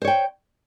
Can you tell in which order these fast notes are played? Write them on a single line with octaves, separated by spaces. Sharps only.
C5 C#5 G5